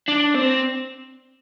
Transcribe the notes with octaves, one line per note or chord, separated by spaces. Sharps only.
D4
C4